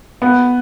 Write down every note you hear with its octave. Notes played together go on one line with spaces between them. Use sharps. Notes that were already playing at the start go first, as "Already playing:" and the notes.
B3